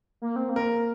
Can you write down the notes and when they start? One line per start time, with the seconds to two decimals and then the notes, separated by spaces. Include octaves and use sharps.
0.22 A#3
0.36 C4
0.49 A#3
0.56 A#4